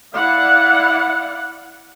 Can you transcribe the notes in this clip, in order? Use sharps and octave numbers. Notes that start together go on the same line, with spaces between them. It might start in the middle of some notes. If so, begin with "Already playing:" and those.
E4 D5 F5 F#5